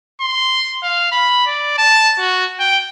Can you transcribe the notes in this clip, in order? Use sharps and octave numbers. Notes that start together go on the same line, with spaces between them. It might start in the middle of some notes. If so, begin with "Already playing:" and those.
C6
F5
B5
D5
A5
F#4
G5